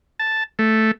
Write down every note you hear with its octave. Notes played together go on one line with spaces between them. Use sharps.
A5
A3